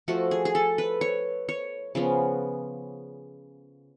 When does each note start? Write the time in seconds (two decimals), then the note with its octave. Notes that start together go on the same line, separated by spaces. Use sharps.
0.08 F3 A3 F#4
0.31 G#4
0.45 G#4
0.55 A4
0.78 B4
1.01 C#5
1.49 C#5
1.95 C#3 F3 B3